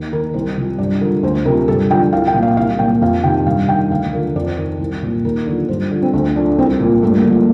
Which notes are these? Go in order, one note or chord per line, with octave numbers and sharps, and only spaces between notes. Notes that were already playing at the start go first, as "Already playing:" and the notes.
Already playing: D#2
D#3 A#4
C2 C5
C3 F3
G2 D5
D3 F3 A#4
D2 C5
C3 F3 A#4
G2 A4
D3 F3 G5
C2 F5
G5
A#2 F3
F5
C2 F5
A#2 F3 G5
F2 F5
C3 D#3 G5
G2 F5
D#3 G5
D2 F5
D3 F3 A#4
F2 D5
C5
D#3 A#4
C2
A#2 F3
D#2 A#4
D3 F3
G2 C5
D3 F3 F4
C4
D2 D4
D3 F3 D4
C2 C4
A#2 F3 A#3
G2 A3
A#3
D3 F3
A#3